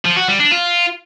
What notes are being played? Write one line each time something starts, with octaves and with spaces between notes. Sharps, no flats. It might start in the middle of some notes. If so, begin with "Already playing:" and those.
F3
F#4
G3
D4
F4